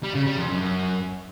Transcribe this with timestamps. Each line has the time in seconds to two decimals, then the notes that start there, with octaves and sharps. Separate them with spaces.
0.03 G3
0.15 C#3
0.26 G3
0.38 F2
0.50 F#2